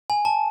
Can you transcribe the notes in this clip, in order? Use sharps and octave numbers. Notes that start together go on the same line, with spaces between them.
G#5
A5